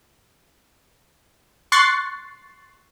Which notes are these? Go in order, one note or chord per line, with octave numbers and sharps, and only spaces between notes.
C6 C#6 F#6 A6 C7